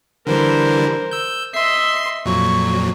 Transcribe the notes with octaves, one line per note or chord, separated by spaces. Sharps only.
D3 E3 G3 A#4 C5
E6 G6
D#5 E5 C6 C7
F2 A#2 F#3 C#6